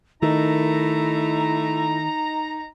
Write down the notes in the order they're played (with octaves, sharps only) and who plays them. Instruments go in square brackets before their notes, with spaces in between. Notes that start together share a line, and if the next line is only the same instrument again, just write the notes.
[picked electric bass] D#3 [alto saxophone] A3 [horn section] D#4 A#5 [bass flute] E4